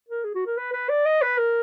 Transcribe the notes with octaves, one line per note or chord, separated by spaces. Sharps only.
A#4
G#4
F#4
A#4
B4
B4
D5
D#5
B4
A#4